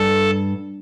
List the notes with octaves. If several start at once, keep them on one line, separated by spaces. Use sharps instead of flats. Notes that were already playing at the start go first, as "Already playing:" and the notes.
Already playing: G2 A4